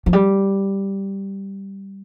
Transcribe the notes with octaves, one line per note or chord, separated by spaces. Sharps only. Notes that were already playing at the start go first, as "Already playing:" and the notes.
F3
G3